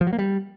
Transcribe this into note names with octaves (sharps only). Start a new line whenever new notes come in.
F3
F#3
A#3
G3